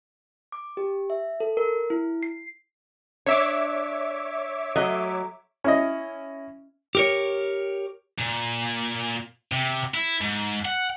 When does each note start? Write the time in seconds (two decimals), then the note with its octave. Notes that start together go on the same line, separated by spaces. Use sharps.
0.52 D6
0.77 G4
1.10 E5
1.40 A4
1.57 A#4
1.90 E4
2.23 C7
3.26 D4 C#5 E5 D6
4.76 F#3 A3 D#5
5.64 C#4 E4 D#5
6.95 G4 A#4 C#5
8.18 A#2
9.52 C3
9.95 E4
10.22 G#2
10.65 F#5